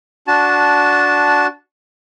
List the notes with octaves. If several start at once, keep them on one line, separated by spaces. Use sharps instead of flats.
D4 F#4 A5